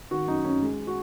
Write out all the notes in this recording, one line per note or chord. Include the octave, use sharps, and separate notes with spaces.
D#3 F#4
F#2 D#4
F#2 C#4
G#3
F#4